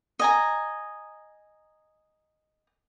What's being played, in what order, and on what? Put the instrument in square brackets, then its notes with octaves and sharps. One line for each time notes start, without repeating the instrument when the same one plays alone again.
[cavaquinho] D#5 G#5 A#5